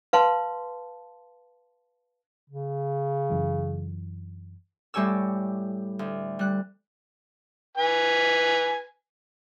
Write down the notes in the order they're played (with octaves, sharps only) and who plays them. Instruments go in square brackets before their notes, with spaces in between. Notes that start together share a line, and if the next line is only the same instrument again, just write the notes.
[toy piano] B4 F5 A5 C6
[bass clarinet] C#3
[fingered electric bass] F#2 E3
[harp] A2 G3 G4 C#5 G#5 E6
D2
G3 F#6
[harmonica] B4 G#5